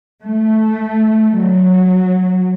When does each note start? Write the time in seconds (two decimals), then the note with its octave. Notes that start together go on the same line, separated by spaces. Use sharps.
0.23 A3
1.36 F#3